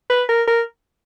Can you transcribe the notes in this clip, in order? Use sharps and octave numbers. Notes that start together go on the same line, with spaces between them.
B4
A#4
A#4